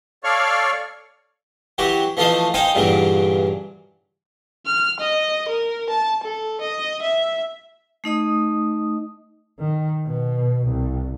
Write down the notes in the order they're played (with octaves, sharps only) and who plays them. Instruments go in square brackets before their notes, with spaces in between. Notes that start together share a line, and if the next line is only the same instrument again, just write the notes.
[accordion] A4 C#5 D5 F5 C#6 F6
[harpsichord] E3 F#3 F#4 G4
E3 F3 A3 F4 C5 D#5
D#4 C5 F5 G5 G#5
G2 A#2 C#3 E3 F#3
[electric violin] F6
D#5
A#4
A5
A4
D#5
E5
[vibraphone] A3 D#4 D#5 D#6
[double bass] D#3
B2
C2